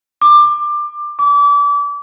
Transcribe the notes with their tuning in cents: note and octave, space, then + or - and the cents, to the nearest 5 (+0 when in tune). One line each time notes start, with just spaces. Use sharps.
D6 +20
D6 -30